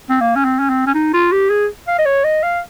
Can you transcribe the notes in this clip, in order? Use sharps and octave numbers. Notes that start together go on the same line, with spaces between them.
C4
A#3
C#4
C4
C#4
C4
C#4
D#4
F4
G4
G#4
F5
D#5
C#5
D#5
F5